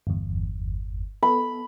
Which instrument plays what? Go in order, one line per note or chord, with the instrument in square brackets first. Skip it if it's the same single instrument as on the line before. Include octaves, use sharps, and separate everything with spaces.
[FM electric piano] G1 E2
[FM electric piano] B3 A4 [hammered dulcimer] B5